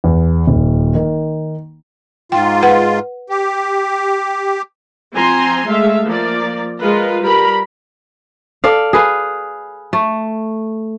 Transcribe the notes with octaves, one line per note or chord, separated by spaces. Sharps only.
E2
D#1
D#3
G#2 F4 G5
B4 F#5
G4
F3 C4 G#5 A#5 C6
G#3 A3 E5 F5
F3 A#3 A#4 D5
G#3 F4 A#4 B4
G3 A#4 B5
A4 D5 F5
G#4 B4 F5
A3